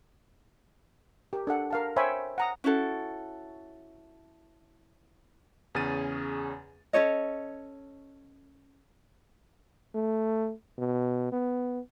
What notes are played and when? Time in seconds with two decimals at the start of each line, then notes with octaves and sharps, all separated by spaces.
1.33 G4 A#4
1.47 D4 A4 F#5
1.70 A#4 F5 A5
1.96 C5 C#5 E5 G5 G#5 B5
2.38 F#5 A#5 D#6
2.64 C#4 E4 F#4 A4
5.75 E2 C#3 C#4 G#4 A6 D#7
6.93 C#4 A4 C#5 D#5
9.95 A3
10.78 B2
11.32 B3